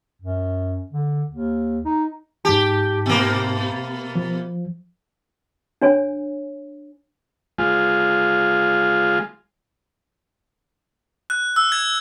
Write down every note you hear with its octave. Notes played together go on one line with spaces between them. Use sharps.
F#2
D3
D#2
D#4
G#2 G4 A5
B2 A#3
F3
D4 C#5 G#5
G#3 F4
F#6
E6
G#6